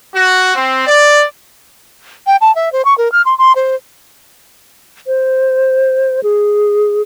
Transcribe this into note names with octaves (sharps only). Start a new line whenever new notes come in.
F#4
C4
D5
G5
A5
E5
C5
C#6
A#4
F6
C6
C6
C5
C5
G#4